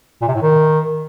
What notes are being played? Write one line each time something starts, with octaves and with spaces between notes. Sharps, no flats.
A#2
C3
A2
D#3